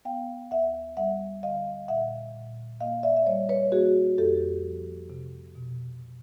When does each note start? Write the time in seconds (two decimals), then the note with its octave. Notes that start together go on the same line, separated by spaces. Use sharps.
0.05 B3 F5 G5
0.51 D2 E5 F#5
0.97 G3 E5 F#5
1.43 D3 D#5 F5
1.88 A#2 E5 F#5
2.35 A#2
2.81 A#3 D#5 F5
3.03 D5 E5
3.16 E5
3.27 G3 C#5 D#5
3.49 B4 C#5
3.72 A#3 F#4 G#4
4.18 F2 G4 A4
4.64 F3
5.10 C3
5.55 B2
6.01 B2